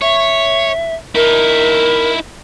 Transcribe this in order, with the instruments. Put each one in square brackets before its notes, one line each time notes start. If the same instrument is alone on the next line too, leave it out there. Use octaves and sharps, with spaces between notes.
[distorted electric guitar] C#5 [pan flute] E5
[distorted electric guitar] D#4 E4 [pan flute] A#4